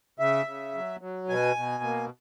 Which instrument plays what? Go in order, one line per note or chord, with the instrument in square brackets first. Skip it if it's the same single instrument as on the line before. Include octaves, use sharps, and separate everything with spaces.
[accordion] C#3 E5
C#3
F#3
F#3
B2 G#5
B2
A#3